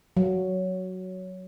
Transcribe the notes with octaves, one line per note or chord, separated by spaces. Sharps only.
F#3